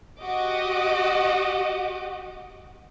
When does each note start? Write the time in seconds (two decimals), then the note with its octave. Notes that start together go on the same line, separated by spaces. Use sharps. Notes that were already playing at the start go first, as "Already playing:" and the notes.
0.21 F#4 G4 D#5 D6